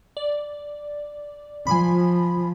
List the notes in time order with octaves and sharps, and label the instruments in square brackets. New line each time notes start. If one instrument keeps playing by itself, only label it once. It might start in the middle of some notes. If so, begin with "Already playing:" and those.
[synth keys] D5
[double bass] F3 [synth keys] G#5 B5